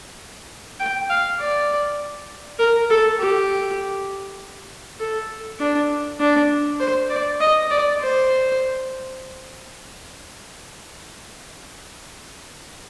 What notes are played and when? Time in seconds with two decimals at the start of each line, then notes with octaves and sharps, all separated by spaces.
0.80 G5
1.10 F5
1.39 D5
2.59 A#4
2.90 A4
3.19 G4
5.00 A4
5.59 D4
6.20 D4
6.80 C5
7.10 D5
7.40 D#5
7.70 D5
8.00 C5